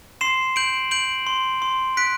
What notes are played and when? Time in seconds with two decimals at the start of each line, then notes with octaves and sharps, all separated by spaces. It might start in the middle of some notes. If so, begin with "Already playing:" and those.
0.21 C6 C7 E7
0.56 G6 D7 F#7
0.91 G6 D7 F#7
1.27 C6
1.62 C6
1.97 F#6 B6 D7